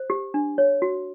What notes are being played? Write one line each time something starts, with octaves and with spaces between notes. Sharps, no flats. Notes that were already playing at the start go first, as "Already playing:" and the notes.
Already playing: C5
G4
D4
C#5
F#4